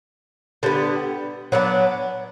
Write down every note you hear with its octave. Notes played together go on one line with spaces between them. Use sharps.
D3 G3 B3
F#3 B3 D4